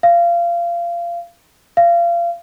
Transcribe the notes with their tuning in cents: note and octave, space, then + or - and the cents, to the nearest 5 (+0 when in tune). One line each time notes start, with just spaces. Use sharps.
F5 -25
F5 -30